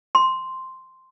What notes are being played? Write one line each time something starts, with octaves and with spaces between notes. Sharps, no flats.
C6